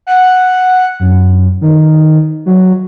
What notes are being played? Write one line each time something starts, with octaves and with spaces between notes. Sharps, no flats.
F#5
F#2
D#3
F#3